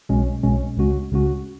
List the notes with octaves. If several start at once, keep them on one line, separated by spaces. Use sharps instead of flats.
B1 B2 G#3 C#4
B1 B2 G#3 C#4
C#2 C#3 G#3 C#4 F#4
C#2 C#3 G#3 C#4 F#4